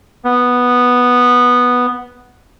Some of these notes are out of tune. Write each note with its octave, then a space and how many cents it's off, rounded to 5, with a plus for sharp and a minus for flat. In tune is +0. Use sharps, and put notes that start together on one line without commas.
B3 -5